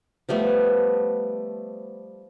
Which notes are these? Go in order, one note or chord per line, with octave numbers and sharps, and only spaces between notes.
F3 G3 A3 B3